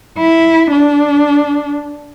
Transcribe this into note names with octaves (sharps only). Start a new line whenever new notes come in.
E4
D4